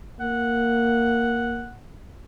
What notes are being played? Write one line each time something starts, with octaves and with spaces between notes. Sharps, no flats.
A#3 F#5